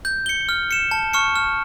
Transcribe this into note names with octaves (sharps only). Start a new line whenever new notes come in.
G6
C#7 G7
F6
C#7 E7
A5
C#6 F6 C#7
F6